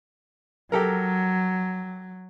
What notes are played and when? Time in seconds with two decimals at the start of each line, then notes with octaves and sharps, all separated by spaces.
0.72 F#3 G4 A4 A#4